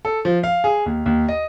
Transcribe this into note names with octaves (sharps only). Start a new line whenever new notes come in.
A4
F3
F5
G#4
D#2
D#2
D#5